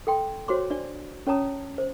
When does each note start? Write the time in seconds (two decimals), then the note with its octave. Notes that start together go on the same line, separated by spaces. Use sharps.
0.07 A4 G5 C6
0.48 F#4 C5 C#5 C6 D6
0.70 D4 D5
1.27 C#4 C#5 A5 A#5 D#6
1.78 C5